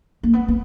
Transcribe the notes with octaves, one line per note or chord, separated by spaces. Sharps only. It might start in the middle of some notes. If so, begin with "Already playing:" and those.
A#3
B3
B3